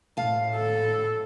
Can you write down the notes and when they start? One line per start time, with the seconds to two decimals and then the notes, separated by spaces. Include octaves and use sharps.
0.17 A2 F5 A5
0.55 A4